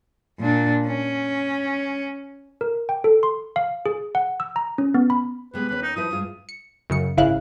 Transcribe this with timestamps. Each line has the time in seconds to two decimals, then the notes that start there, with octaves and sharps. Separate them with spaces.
0.40 A#2 D4
0.86 C#4
2.61 A#4
2.89 G5
3.04 A4
3.23 C6
3.56 F5
3.86 G#4
4.15 F#5
4.40 E6
4.56 A#5
4.78 C#4
4.94 B3
5.10 B5
5.54 C3 G#3 B3 B4
5.69 D#2 C#4 B4
5.82 D#4
5.96 F3 E4 B4 D#6
6.11 G2 G#3 F4
6.49 C#7
6.90 F#2 C#3 C#7
7.17 G#1 C#3 E4 F5 F#6